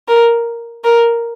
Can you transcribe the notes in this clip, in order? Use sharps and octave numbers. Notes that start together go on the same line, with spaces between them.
A#4
A#4